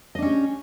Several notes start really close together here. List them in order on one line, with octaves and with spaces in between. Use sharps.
D#5 D4 C#4 G4